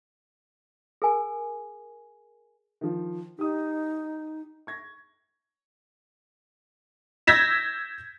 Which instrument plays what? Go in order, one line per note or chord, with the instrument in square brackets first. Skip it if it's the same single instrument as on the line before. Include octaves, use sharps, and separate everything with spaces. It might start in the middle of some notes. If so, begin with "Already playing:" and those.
[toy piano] G#4 A#4 G#5
[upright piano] D#3 F3
[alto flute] D#4 [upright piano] G4 D#6
[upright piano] C#6 G#6 A#6
[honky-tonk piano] E6 G6 G#6 A#6 B6 E7